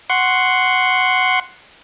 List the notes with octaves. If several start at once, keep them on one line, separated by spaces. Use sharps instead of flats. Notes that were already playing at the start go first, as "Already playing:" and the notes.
F#5 C6 C#6